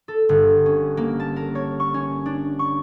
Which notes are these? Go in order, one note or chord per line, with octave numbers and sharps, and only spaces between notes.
A4
G1
C#4
A#3
A5
A#4
C#5
C#6
C#4
D4
C#6